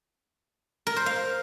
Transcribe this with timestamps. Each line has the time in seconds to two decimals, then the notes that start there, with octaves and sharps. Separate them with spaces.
0.87 A#4
0.96 C5
1.06 F5